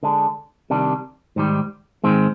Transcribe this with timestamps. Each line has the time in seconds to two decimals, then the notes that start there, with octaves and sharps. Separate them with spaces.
0.03 D3 G#3 D4
0.70 C3 D#3 G3 D4
1.36 G#2 D#3 G3
2.04 G#2 D#3 G#3 C4